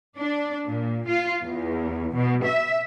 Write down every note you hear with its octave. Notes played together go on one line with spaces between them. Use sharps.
D4
A#2
F4
E2
B2
E5